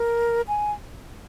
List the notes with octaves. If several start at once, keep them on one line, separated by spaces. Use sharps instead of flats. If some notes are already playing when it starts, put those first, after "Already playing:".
Already playing: A#4
G#5